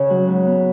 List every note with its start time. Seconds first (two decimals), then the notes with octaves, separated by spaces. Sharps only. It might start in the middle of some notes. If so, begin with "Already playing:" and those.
Already playing: C#3 C#4 C#5
0.10 F#3
0.28 G#2
0.46 B3